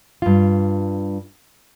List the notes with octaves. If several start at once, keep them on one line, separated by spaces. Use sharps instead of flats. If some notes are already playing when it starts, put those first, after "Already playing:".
G2 F4